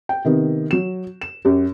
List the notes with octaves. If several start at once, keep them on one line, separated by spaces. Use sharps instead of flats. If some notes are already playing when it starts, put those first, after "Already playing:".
G5
C3 D#3 B3
F#3 E7
E7
F#2 G4